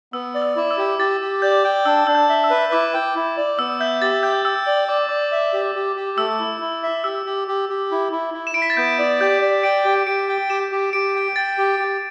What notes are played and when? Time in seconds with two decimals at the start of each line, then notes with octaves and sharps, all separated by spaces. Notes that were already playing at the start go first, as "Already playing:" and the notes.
0.13 B3 E6
0.35 D5
0.42 E6
0.56 E4 D6
0.71 E6
0.78 G4
0.99 G4 A6
1.21 G4
1.42 D5 G6
1.64 G5
1.86 D4 E6
2.07 D4 E6
2.15 G6
2.29 E5
2.44 E6
2.50 B4
2.72 E4 D6
2.94 G5
3.15 E4
3.37 D5
3.59 B3 E6
3.80 E5 G6
4.02 G4 A6
4.23 G5 G6
4.45 G5 E6
4.67 D5
4.88 D5 D6
5.09 D5 D6
5.32 E5
5.53 G4
5.75 G4
5.96 G4
6.18 A3 E6
6.40 E4
6.61 E4
6.83 E5
7.04 G4 E6
7.26 G4
7.48 G4
7.69 G4
7.91 E4
8.12 E4
8.34 E4
8.47 E7
8.54 E4 D7
8.62 B6
8.70 A6
8.77 B3 G6
8.99 D5
9.20 G4 G6
9.42 D5
9.63 G5 D7
9.85 G4
10.07 G4 D7
10.29 G5
10.50 G4 E7
10.72 G4
10.93 G4 D7
11.15 G5
11.36 G5 A6
11.58 G4
11.79 G4